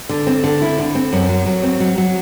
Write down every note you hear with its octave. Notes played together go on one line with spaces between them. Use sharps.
D3
C4
D3
E4
D3
C4
F#2
F#3
F#3
C4
F#3
F#3